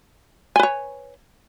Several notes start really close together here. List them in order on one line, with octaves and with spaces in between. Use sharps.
G#5 B4 C#5